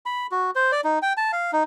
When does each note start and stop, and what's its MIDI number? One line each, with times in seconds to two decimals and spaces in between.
0.06 0.27 83
0.31 0.51 66
0.56 0.71 72
0.72 0.81 74
0.84 0.99 63
1.02 1.13 79
1.17 1.32 81
1.32 1.51 77
1.53 1.63 63